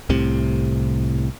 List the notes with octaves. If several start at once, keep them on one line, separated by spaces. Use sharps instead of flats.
C2 A2 C3